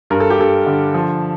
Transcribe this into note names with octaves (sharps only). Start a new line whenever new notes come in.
G2 A#4
A4
G4
G2 A4
D3
F3